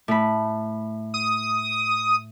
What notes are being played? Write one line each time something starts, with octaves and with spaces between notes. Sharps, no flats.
A2 B5
D#6